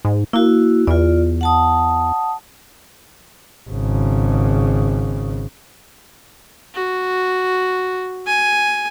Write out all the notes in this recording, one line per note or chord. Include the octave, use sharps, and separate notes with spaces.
G#2
A#3 E4 F#4
E2 F4 D5
F#5 A5 D#6
G#1 C#3
F#4
G#5